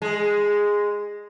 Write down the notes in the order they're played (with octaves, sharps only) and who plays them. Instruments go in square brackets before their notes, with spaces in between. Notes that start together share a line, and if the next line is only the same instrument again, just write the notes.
[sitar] G#3